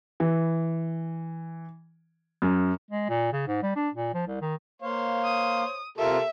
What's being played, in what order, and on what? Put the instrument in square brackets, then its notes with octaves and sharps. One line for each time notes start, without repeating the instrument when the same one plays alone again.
[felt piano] E3
F#2
[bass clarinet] G#3
A#2
C#3
G#2
G3
D4
A#2
F3
C2
D#3
[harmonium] A#3 F5 [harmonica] C5 C#5
[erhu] D#6
[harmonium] C3 F4 A#4 [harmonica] A#3 G4 A4 [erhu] E5